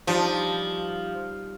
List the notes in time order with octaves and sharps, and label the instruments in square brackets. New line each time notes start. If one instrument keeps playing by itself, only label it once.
[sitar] F3 [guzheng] G3 D#4